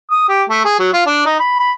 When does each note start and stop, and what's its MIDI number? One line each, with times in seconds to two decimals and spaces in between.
0.11 0.26 87
0.29 0.43 67
0.50 0.61 57
0.65 0.76 68
0.79 0.91 54
0.93 1.06 65
1.06 1.24 62
1.26 1.37 63
1.40 1.57 83
1.60 1.72 83